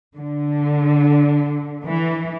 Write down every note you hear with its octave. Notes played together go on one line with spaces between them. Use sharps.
D3
E3